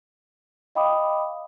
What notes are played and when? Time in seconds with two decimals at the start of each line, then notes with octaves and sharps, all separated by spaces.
0.75 D#5 F5 G5 B5 D6 D#6